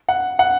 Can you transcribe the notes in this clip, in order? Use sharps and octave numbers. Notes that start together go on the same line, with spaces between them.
F#5
F#5